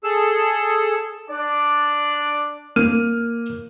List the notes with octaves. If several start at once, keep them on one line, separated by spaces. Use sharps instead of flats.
G#4 A4 E6
D4 D5
A#3 F6 D#7